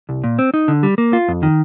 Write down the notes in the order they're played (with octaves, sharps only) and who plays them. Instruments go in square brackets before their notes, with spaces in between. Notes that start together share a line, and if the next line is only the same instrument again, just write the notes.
[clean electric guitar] C2
A#2
C4
D#4
D3
G3
A#3
F4
F2
D#3